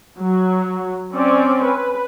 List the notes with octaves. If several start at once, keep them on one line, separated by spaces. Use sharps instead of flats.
F#3
C4 C#4 D5
B4